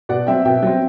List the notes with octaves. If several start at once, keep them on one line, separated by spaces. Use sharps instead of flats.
B2 D5 F#5
F#3 C4 E5 G5
B2 E5 G5
F#3 C4